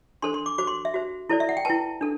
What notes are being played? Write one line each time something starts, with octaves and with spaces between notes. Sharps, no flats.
D4 A4 C5 C6
C6
D6
F#4 C5 D6
C6
E5
F#4 C5
E4 A4 C5 D5
E5
F#5
G5
E4 B4 A5
D4 A4